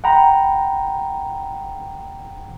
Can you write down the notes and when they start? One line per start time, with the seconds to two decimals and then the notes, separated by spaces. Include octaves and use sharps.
0.04 F#5 G5 A#5 B5